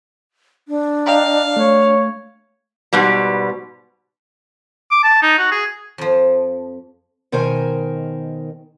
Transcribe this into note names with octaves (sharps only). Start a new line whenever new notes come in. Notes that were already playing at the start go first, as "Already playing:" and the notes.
D4
D#5 F5 G5 A#5
A3 C#5
G#2 B2 G3
D6
A5
D#4
F#4
G#4
F2 F3
B2 D#3 A#4 C5 G#5